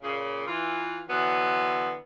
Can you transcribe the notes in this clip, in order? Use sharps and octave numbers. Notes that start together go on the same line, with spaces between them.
A#2 C#3
E3 F4
D3 E3 F#3 B3